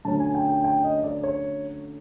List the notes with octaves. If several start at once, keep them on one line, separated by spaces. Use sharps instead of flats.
D3 F#3 A3 C#4 A5
G#5
G5
G5
G5
D#5
D5
C#5